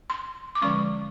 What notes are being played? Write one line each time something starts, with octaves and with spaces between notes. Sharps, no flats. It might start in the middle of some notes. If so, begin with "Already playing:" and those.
C6
D6
D3 F3 G#3 C#4 C#6